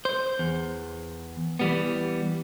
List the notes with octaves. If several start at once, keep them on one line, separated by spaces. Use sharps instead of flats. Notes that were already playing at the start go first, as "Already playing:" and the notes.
C5
E2
E3 G3 B3